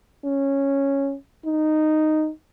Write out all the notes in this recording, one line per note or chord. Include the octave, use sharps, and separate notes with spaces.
C#4
D#4